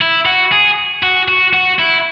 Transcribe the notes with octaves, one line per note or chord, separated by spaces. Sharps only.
E4
F#4
G#4
F#4
F#4
F#4
E4